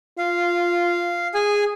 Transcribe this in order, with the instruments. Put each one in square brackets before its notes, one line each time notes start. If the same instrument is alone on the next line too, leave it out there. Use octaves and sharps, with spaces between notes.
[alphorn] F4 [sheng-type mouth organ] F5
[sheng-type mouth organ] G#4 G#5